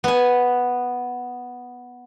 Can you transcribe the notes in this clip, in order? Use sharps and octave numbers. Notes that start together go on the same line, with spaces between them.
B3 G#5